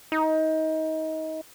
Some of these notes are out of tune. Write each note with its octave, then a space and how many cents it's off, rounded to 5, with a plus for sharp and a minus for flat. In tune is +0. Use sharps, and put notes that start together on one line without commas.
D#4 +25